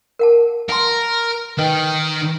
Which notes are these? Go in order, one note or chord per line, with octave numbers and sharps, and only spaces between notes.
A#4 F#5 A5
A#4 F#5 A5 C6
D#3 B4 D#5 G5